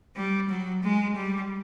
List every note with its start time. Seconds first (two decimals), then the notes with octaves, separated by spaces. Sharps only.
0.16 G3
0.49 F#3
0.84 G#3
1.16 G3